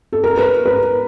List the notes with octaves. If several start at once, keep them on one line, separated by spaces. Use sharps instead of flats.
A4
A#4
B4
B4